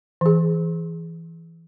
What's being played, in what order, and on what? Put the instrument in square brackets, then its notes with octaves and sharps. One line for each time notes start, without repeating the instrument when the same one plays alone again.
[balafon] E3 G#4